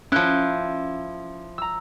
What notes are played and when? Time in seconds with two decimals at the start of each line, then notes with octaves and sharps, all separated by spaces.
0.12 F3 C#4 E4 F#6 G6
1.58 A#5 E6